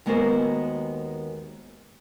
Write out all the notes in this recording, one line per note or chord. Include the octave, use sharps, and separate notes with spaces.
D#2 G#3 B3 F#4 A#4 C5